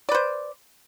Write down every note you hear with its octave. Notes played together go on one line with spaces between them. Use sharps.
B4 C5 D5